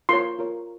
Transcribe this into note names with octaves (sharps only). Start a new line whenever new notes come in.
F4 A#4 C#5 C6
F4 A#4 C#5